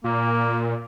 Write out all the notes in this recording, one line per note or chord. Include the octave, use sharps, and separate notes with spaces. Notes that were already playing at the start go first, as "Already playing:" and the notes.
A#2 A#3